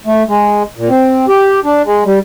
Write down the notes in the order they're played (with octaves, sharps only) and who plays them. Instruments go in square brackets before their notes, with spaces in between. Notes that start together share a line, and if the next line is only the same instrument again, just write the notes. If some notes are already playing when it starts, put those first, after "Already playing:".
[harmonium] A3
G#3
A#2
C4
G4
D4
G#3
G3